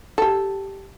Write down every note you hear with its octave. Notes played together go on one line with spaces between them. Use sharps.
G4 A4